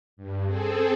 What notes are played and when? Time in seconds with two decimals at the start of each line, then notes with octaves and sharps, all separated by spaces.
0.17 G2
0.47 C4 G#4 A4